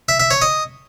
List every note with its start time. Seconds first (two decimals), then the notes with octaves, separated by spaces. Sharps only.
0.09 E5
0.20 E5
0.31 C#5
0.42 D#5